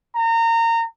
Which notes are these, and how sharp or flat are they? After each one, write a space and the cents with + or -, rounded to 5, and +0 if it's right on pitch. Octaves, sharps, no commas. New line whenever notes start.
A#5 -25